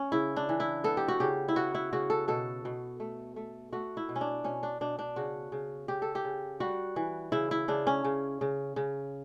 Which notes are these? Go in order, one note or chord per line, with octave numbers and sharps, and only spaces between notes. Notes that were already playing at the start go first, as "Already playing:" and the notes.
Already playing: C#4
C#3 E4
D4
E3
E4
B3 A4
G4
F#4
C#3 G4
E4
B3 F#4
E4
C#3 F#4
A4
B2 A4
B2
A3
A3
A3 F#4
E4
B2
C#4
D4
B2 C#4
D4
B2 D4
D4
C#3 F#4
C#3
C#3 G4
A4
G4
C#3
G3 F#4
E3
C#3 E4
E4
C#3 D4
C#4
C#3
C#3
C#3